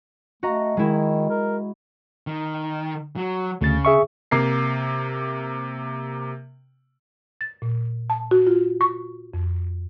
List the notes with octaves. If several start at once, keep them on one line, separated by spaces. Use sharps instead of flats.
A3 F#4 D#5 A#5
D#3 G#3 E4
A#4
D#3
F#3
D2 C#3 A6
G#4 E5 C#6
C3 A#3 C7
A6
A#2
A5
F#4
F4
C#6
F2